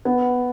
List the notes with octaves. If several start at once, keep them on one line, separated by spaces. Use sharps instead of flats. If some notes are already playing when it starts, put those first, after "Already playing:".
B3